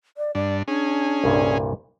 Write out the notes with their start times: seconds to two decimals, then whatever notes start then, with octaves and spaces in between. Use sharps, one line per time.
0.17 D5
0.35 G2 D4 D5
0.68 C#4 D4 G#4
1.24 C2 G2 A#2